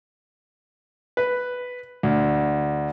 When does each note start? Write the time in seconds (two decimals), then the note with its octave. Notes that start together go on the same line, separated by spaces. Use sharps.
1.17 B4
2.03 D2